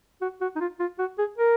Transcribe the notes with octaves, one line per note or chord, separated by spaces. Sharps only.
F#4
F#4
D#4
F4
F4
F#4
G#4
A#4